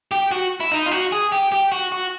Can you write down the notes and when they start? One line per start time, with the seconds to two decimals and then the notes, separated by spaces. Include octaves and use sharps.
0.12 G4
0.31 F#4
0.60 E4
0.72 D#4
0.86 F4
0.91 F#4
1.12 G#4
1.32 G4
1.52 G4
1.72 F#4
1.92 F#4